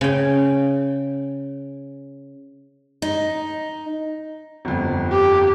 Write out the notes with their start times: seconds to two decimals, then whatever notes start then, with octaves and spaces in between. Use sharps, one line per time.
0.01 C#3 G5
3.02 D#4
4.65 G1 F2
5.11 G4